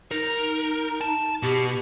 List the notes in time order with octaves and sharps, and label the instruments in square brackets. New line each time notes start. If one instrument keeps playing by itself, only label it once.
[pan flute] D#4 [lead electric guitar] A#4
[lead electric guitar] A5
[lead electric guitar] B2 [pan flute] G4